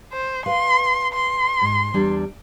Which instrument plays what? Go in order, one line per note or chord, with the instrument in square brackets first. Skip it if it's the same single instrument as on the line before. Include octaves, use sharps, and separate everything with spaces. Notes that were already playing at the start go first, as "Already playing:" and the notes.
[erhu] C5
[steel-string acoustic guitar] B4 F5 [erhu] C6
[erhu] C6
[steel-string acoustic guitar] G#2
E2 G3 D4